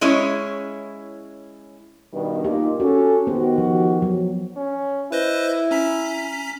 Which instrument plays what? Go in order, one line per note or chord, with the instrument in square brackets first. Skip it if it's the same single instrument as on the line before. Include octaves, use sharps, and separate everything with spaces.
[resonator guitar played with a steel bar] G#3 C#4 E4 C#5
[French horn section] G2 B2 D#3
[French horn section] A#2 D#4 [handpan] G4
[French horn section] C#4 A4 [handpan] F#4
[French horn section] D#3 F#4 G4 [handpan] B3 C5
[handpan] F3
F#3
[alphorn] C#4
[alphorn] E4 [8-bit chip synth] B4 C5 D#5
[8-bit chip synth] C#4 A#5 B6